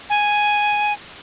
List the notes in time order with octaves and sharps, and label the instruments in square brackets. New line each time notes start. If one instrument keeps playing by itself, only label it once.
[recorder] G#5